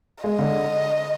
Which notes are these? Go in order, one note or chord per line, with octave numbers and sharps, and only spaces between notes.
G#3 D#5
D3